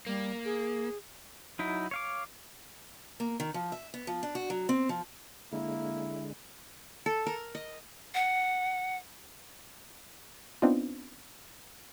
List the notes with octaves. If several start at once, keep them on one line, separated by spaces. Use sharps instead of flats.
G3 A#3
G#4
F#3 D#4 E4
C#5 F5 D6
A#3
D#3
F3
E5
B3
F3
D4
F#4
F#3
C4
F3
D3 G#3 A#3 E4
A4
A#4
D#5
F#5
B3 C4 D4 D#4 F4